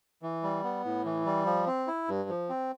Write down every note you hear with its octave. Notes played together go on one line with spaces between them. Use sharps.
E3
G3
B3
A2
E3
G3
F3
C4
E4
G2
F3
C4